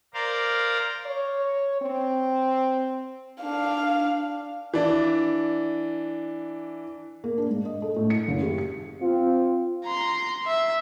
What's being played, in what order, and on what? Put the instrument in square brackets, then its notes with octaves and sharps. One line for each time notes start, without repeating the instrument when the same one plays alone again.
[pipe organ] A#4 C5 D5 F5 A#5
[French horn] C#5
C4
[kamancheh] D4 F5
[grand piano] E3 D4
[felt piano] A#3
D4
G#2
D#5
A4
A2
C#7
F#1
G4
C#7
[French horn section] C4 F4
[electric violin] A#5 C6
E5